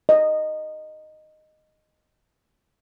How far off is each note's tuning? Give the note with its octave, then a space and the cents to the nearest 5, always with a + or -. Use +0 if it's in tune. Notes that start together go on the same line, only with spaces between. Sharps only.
D#5 -10